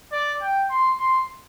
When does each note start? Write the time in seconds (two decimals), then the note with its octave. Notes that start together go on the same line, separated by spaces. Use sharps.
0.12 D5
0.42 G5
0.70 C6
1.00 C6